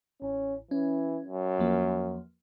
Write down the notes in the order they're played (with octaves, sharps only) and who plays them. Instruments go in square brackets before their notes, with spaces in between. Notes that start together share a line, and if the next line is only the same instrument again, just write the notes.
[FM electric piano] A1 [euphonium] C#4
[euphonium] E3 [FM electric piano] C#4
[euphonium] F#2
[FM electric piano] E2 F3 A#3